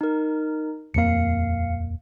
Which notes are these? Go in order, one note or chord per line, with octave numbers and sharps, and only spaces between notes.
D#4 A#4
D#1 F2 A#3 F5 C#7